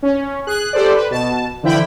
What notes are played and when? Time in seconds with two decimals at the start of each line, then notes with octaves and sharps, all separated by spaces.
0.03 C#4
0.47 G#4 F#6
0.73 G4 A4 C5 D5
0.94 B4
1.11 B2 A5
1.63 D3 E3 F3 E4 G5 B5